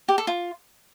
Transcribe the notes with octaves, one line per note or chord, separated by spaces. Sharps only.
G4
A4
F4